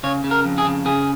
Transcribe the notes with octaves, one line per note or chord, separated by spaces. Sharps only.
C#3 C#5
C#3
A#4
F2
G#4
C#3
C#3 G#4